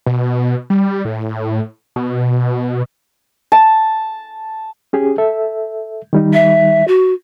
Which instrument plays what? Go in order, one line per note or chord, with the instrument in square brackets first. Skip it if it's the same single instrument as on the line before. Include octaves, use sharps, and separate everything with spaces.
[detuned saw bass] B2
G3
A2
B2
[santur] A5
[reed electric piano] C#4 G4 G#4
A4 E5
D#3 G3 D#4
[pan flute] E5
F#4